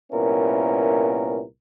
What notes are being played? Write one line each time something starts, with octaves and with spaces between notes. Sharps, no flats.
C2 A#2 B3 C#4 E4 A#4